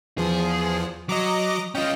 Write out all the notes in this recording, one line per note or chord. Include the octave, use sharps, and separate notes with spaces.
E2 F3 G#4
F#3 D#5 A#5 D6
C#4 F4 D#5 G5